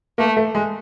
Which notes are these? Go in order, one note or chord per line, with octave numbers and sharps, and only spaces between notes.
A3 A#3
A3
G#3